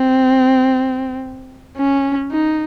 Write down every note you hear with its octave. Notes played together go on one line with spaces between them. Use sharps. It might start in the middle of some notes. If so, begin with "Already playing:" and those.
Already playing: C4
C#4
D#4